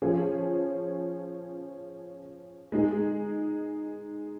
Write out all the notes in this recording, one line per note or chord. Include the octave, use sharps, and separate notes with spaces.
F3 C#4 G#4 C#5
G#3 D#4 G#4